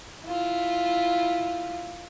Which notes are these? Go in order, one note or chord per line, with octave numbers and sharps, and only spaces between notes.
E4 F4